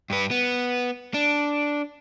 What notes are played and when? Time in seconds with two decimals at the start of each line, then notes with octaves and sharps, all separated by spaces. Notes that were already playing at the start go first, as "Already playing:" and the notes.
0.10 G2 B4
0.31 B3
1.14 D4